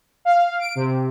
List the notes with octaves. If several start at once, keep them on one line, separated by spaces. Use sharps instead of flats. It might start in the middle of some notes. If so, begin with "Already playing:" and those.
F5
D7
C3